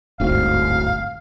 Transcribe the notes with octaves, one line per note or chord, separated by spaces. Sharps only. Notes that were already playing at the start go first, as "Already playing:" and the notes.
D1 G1 G#2 A3 C4 F#4 F5